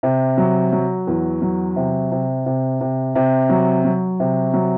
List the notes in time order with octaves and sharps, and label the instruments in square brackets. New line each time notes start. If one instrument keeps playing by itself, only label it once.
[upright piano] C3
F#3
F#3
E2
F#3
C3
C3
C3
C3
C3
F#3
F#3
C3
F#3